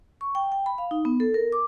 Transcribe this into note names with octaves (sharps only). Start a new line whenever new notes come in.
C#6
G5
G5
B5
F5
D#4
B3
A4
A#4
D6